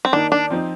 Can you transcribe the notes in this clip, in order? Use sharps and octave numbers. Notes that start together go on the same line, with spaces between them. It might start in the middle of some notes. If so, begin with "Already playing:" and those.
C4
D#3 A#3 D4 D#4
D4
F3 C4 D#4